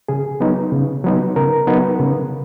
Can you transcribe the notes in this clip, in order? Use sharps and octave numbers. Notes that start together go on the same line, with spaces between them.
C#3 G#4
F#3 B3 D#4
C#3
F#3 B3 D#4
C#3 A#4
F#3 B3 D#4
C#3